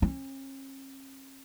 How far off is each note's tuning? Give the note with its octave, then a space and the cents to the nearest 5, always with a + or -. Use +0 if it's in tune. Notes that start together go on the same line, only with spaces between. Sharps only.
C#4 -45